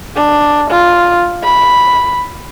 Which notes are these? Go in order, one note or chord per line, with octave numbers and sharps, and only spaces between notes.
D4
F4
B5